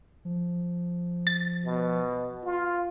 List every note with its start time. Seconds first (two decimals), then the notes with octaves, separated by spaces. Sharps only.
0.25 F3
1.27 A6
1.65 B2
2.44 F4